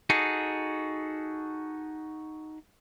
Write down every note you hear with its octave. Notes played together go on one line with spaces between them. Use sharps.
D#4 F#4 G#4 A4